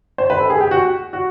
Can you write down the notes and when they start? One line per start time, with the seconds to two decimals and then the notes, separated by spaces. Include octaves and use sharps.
0.18 C5
0.30 B4
0.40 A4
0.50 G#4
0.61 G4
0.71 F#4
1.13 F#4